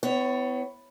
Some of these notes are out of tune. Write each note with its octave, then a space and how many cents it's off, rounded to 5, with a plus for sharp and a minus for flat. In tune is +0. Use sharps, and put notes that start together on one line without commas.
B3 +40 E4 +0 C#5 +5